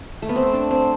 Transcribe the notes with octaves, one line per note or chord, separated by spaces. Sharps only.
A3
B3
C4
D4
C4